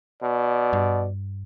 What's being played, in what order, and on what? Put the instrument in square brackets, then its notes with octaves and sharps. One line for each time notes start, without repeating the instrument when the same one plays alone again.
[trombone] B2 [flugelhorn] D5
[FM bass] G2